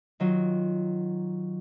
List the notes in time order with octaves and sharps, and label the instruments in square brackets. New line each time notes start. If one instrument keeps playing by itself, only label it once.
[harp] D#3 F#3 F4